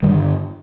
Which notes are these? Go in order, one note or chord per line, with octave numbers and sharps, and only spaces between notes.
G2 D3 D#3 G3